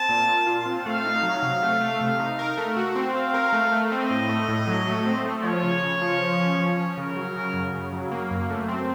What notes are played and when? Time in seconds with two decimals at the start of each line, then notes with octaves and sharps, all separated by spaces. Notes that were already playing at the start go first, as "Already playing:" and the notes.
Already playing: C4 A5
0.09 A#2
0.28 A#2
0.47 F4
0.66 C4
0.86 A3 F5
1.05 D#4
1.23 F#3
1.42 C3
1.62 A3
1.80 A3
2.01 C3
2.20 D#4
2.39 A#4
2.57 A3
2.76 F#4
2.96 C4
3.15 C4 F5
3.34 A#4
3.53 A3
3.72 A3
3.91 C4 D#5
4.10 A2
4.29 A3
4.48 A2
4.68 F#3
4.87 A3
5.06 C4
5.25 A3
5.44 F3 C#5
5.64 C#3
5.83 C#3
6.02 F3
6.21 F3
6.40 C#4
6.59 F3
6.77 C#4
6.97 C#3 A#4
7.16 F#3
7.36 C#3
7.54 F#2
7.73 C#3
7.93 F#3
8.12 A#3
8.31 F#2
8.50 A3
8.68 C4